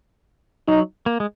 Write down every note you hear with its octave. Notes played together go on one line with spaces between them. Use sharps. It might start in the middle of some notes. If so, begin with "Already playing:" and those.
F#3 D#4
A#3
G#3